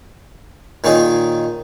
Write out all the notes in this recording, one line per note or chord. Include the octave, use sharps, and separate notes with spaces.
A#2 D#3 C#4 D#4 G#4